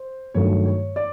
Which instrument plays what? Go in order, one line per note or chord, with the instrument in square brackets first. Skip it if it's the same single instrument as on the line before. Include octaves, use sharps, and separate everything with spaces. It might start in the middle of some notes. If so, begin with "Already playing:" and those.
Already playing: [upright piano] C5
[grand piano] G2 D#3 F#3 A3 [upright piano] C#5
[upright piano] C#5
D5